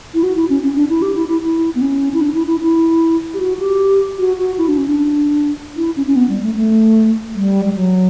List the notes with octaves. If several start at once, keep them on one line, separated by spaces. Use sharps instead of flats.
E4
F#4
E4
C#4
C#4
D4
E4
G4
E4
E4
E4
B3
C#4
E4
D4
E4
E4
E4
G4
F#4
G4
F#4
F#4
E4
D4
C#4
D4
E4
C#4
C#4
B3
G3
A3
A3
G3
G3
F#3